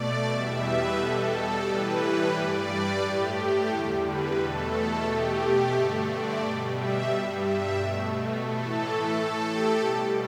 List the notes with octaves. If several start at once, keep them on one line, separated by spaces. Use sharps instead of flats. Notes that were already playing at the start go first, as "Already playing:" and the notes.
Already playing: B2 A3 D5
E2 B2 G3 E5
B4
B2 G3 A4
A4
A2 E3 G3 B4
G2 G3 D5
B4
A2 A3 G4
G4
E2 D3 G3 A4
B4
E2 B2 A3 A4
B2 A3 G4
G4
G2 D3 A3 A4
D5
B2 G3 G5
E5
G2 G3
E5
B2 A3
A2 E3 A3 A4
A2 A3 A4
G4
B2 G3